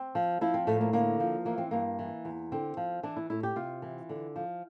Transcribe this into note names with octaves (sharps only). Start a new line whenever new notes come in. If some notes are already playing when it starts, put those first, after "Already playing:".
Already playing: C4
F3
F3 E4
C4
A2 A3
A#3
D3 A#3
F3
E3 A#3
C4
G2 A#3
E3
E2
D3 C4
F3
E3 D4
E4
A2 E4
G4
C3 F4
E3
D3
F3